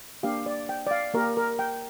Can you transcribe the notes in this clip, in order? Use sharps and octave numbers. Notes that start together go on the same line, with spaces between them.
A#3 D4 G4 F5
D5
G5
D5
F5
A#3 G4 A#4
A#4
G5